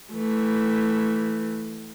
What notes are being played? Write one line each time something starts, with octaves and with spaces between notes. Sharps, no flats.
E3 A3